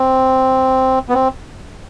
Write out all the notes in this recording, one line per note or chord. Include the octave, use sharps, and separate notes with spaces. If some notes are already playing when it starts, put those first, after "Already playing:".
Already playing: C4
B3
C4